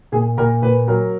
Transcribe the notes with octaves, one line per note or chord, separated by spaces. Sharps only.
A#2 G#4
A#2 A#4
A#2 B4
F#3 A#4